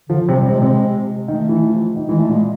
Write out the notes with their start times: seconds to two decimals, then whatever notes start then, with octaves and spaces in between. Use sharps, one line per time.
0.09 D3 F3
0.19 F3
0.29 C3 F#3
0.38 G3
0.49 C3 G#3
0.62 C3
1.28 D#3 A3
1.49 E3
1.69 F3
1.96 D#3
2.09 E3 G#3
2.19 A3
2.29 A#2 G#3